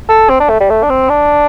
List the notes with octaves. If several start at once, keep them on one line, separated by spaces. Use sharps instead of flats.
A4
C4
D4
A3
G3
A3
D4
C4
D4